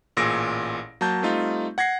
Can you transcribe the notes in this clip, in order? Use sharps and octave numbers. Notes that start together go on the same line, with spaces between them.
A1 A#2 G#4 E6 A#6 D7
F#3 A#3 A5 G6
G3 A3 C4 D#4 F4
F#5 G#6 A#6 C7